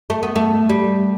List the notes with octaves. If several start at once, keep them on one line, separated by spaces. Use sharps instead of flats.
A3
B3
A3
G3